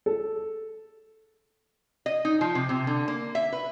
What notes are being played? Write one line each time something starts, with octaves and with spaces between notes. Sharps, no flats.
A4
D#5
D#4
F3
C3
C3
D3
A#3
E5
B4